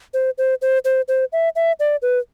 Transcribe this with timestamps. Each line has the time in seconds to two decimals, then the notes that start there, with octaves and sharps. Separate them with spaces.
0.14 C5
0.38 C5
0.62 C5
0.85 C5
1.08 C5
1.32 E5
1.56 E5
1.80 D5
2.02 B4